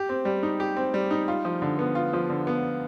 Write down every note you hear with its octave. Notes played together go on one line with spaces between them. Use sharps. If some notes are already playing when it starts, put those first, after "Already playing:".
Already playing: G4
C4
G3
D#4
G4
C4
G3
D#4
F4
F3
D3
B3
F4
F3
D3
B3